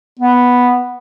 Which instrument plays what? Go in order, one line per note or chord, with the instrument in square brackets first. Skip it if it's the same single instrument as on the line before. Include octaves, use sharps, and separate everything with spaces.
[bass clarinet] B3